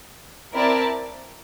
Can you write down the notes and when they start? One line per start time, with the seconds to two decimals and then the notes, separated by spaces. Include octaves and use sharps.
0.55 C4 E4 A#4 D5 A5